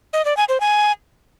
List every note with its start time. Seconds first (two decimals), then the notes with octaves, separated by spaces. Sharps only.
0.13 D#5
0.25 D5
0.37 G#5
0.49 C5
0.60 G#5